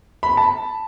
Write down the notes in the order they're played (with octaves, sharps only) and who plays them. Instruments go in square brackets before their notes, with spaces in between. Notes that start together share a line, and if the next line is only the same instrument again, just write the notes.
[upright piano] B5
A5